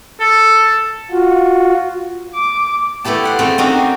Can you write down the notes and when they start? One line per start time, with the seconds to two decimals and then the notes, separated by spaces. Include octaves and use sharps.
0.20 A4
1.11 F4 F#4
2.34 D6
3.04 A3 B3 E4 G4 A5
3.24 C5 F#5 G5
3.39 A3 C4 F4 G#4
3.58 C4 C#4 D#4 F#4 G4 A#4